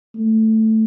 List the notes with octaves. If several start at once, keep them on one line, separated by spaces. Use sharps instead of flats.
A3